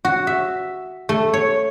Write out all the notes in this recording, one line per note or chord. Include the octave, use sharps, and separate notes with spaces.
F#4
E5
A3
C#5